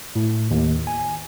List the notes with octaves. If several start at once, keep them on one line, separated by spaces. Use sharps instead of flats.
A2
D#2
G#5